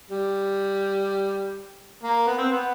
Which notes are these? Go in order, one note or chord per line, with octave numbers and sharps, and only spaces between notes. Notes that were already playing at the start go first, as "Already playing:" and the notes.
G3
A#3
B3
C4
B3